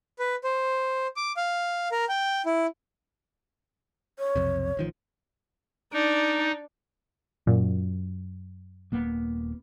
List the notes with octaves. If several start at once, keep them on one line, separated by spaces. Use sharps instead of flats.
B4
C5
D6
F5
A#4
G5
E4
C#5
B1 F2 C3
A1 D#3 F3
D4 D#4 D5
F#2 A#2
D#1 A#3 B3